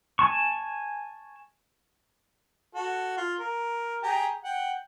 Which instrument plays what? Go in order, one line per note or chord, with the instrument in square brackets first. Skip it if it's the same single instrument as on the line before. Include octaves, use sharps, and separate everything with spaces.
[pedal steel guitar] G#5 A5 C#6
[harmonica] F#4 A4
F4
A#4
G4 G#4 A#5
F#5 G5